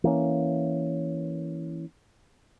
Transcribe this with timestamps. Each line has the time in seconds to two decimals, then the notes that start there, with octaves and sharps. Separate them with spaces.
0.04 E3 A#3 C#4